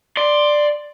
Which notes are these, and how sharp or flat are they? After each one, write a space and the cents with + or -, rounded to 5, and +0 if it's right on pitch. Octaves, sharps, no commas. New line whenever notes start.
D5 +10 C6 +0